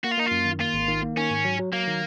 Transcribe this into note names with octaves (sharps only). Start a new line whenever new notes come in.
A#3 F#4
F4
A#3 D#4
F4
F#2
D#3
A#3 F4
G#1
D#3
A#3
D#3 C#4
G#2
F#3
F#3
F#3 A#3
D#3